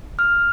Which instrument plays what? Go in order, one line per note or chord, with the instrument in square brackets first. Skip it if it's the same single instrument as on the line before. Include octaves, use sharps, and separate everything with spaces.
[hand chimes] F6